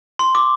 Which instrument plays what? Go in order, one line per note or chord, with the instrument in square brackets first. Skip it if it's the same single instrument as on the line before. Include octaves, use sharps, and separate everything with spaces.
[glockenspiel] C6
D6